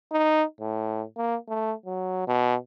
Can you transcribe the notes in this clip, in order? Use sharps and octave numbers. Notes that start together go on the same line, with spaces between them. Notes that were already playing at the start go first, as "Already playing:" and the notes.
D#4
A2
A#3
A3
F#3
B2